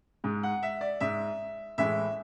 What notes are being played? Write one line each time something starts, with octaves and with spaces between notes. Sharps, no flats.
G#2 G#3
F#5
E5
D5
G#2 G#3 E5
A2 E3 G#3 E5